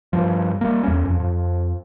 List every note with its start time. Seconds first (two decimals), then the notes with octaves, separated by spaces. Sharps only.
0.13 G2 F3
0.61 G3 A#3
0.83 E2 C#4
1.05 F2
1.20 F2